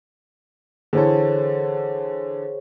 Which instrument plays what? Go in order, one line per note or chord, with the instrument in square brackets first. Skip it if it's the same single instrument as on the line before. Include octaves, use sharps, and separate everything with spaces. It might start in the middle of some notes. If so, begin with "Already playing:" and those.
[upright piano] D3 E3 A4 [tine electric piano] G#4 C5 C#5